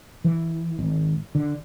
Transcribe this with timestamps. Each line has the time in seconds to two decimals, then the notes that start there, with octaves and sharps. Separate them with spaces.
0.24 E3
0.79 G#1
1.35 D3